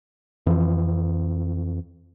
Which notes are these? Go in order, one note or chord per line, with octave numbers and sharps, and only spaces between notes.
F2 E3 F3